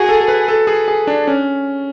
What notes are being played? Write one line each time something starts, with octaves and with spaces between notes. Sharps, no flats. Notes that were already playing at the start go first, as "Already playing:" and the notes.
Already playing: F#4 G#4
A4
A4
B4
A4
G#4
G#4
D4
C#4